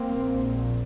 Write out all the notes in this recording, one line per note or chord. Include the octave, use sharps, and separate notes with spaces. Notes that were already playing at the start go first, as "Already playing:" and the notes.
Already playing: A#3 C4
A#1 A#2